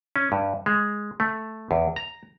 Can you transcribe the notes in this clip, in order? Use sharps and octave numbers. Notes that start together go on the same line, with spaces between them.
C#4
G2
G#3
A3
E2
A#5